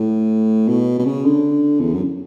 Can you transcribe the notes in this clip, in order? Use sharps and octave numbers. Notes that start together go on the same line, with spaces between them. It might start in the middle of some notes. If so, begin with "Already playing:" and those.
Already playing: A2
B2
B2
C#3
D3
E2
F#2